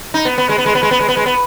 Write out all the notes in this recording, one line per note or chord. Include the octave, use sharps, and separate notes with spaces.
D#4
B3
B3
G#3
B3
G#3
B3
G#3
B3
G#3
B3
G#3
B3